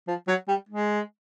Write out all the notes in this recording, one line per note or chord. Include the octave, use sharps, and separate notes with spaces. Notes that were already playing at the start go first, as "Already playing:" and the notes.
F3
F#3
G3
G#3